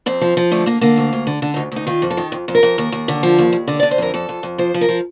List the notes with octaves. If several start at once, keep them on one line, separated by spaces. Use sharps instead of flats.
F2 C4
F3
F3
D3 A3
D3 A#3
D3 A#3
D2
D2
D3
D3 D4
D2 D#4
D2 D#4
D#3 F4
F2
A4
D#3
F2
F2
A#4
F2
D#2
D#2
D3
F3
D#2
D#2
D3 D5
D5
D3
C5
F2 A#4
F2 A4
F2
F2
F3 C5
F3
A#4
F3